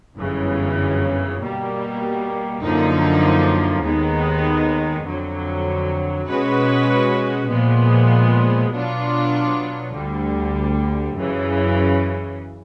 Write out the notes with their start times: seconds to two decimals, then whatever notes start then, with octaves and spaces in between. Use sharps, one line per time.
0.18 G1 F#2 C#3 E3
1.40 B2 G3 A#3
2.62 F#2 D3 F3 A#3 D#4
3.83 D#2 D#3 G#3 B3
5.06 F2 D3 F#3
6.28 B2 G#3 C#4 F#4 B4
7.49 A#2 F3 G#3 B3
8.72 B2 F#3 B3 D4 F4
9.93 D2 D3 G3
11.15 F#2 C#3 E3